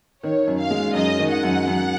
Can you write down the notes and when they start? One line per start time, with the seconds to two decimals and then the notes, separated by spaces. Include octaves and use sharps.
0.23 D#3 C#5
0.47 F#2
0.59 F5
0.70 G#3
0.95 F#2 D#5
1.19 D#3
1.31 F#5
1.43 F#2
1.67 F#2